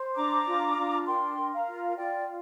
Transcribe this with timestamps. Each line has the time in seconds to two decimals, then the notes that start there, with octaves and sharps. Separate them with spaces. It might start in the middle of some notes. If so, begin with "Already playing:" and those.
Already playing: C5
0.15 D4 A#5 D6
0.46 F4
0.77 D4
1.06 A#4 G5 C6
1.37 A#4
1.52 F5 A#5
1.67 F4
1.97 F4 D5 G5